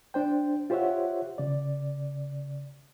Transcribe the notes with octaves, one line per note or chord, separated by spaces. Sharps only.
D4 C5 G5
F4 G4 C5 C#5 E5 F#5
C#3 D5